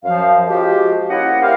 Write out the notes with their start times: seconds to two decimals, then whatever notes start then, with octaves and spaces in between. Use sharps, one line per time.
0.04 F#2 F3 F5
0.47 F3 G#3 F#4 G4
1.09 A#3 C#4 E4 D#5 F#5
1.41 E4 G4 A#4 C5 F5